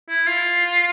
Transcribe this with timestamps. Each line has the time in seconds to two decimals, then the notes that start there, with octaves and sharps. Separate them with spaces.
0.09 E4
0.27 F4